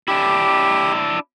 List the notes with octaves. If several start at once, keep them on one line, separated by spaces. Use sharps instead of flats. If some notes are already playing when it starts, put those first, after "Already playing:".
D4 E4 G4